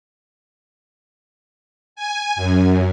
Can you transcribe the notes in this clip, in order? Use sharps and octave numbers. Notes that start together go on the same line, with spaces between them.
G#5
F#2